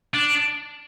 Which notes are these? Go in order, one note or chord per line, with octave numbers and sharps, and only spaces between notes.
D4